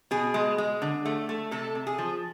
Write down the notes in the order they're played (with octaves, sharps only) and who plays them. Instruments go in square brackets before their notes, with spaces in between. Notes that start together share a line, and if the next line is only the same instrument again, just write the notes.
[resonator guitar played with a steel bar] B2 G#4
G#3
G#3
D3
A3
A3
C3 A4
C3
G#4
F3